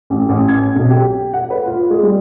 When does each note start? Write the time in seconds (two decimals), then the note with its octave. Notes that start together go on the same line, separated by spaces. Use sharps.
0.10 A1
0.29 A1
0.48 G#6
0.76 B1
0.90 G4
1.33 F#5
1.50 B4
1.66 F4
1.90 G#3
2.03 G3